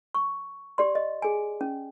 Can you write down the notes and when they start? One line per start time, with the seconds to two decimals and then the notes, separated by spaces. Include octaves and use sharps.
0.14 C#6
0.78 G4 D5 C6
0.95 D#5
1.22 G#4 G#5
1.61 C#4